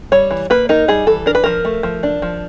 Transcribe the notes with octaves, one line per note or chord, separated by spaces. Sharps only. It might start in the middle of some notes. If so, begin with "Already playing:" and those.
G3 C#5
E3
A#3 B4
D#4 A#4
G3 G#4
E3 A4
D4 A#4
B4
F3 A#4
A3
F3
D4
F3